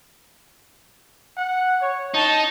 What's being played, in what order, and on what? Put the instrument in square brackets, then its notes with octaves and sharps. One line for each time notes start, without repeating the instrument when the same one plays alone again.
[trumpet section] F#5
C#5
[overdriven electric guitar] D#4 [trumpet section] A5